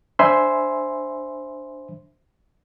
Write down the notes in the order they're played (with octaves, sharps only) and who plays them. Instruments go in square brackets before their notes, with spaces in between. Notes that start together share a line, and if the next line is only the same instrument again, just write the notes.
[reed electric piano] D4 C5 E5 G#5 B5 C6